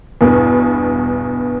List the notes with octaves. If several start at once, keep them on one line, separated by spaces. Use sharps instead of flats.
E2 G2 B2